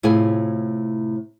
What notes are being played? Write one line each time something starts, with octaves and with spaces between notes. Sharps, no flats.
A2 C3 E4 F4 G#4 G#5